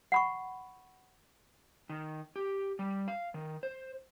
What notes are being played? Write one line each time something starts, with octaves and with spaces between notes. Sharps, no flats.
F#5 B5 C#6
D#3
G4
G3
F5
D#3
C5